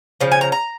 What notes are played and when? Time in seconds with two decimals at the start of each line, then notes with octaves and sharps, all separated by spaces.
0.21 C#3 F3
0.32 G#5
0.41 A#5
0.52 A#5